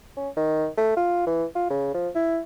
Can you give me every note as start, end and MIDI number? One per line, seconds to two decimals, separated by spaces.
0.17 0.29 61
0.37 0.67 51
0.77 0.94 57
0.97 1.22 65
1.27 1.45 52
1.55 1.66 65
1.70 1.93 49
1.94 2.09 53
2.15 2.39 64